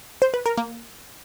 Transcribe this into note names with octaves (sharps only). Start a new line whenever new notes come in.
C5
B4
A#4
A#3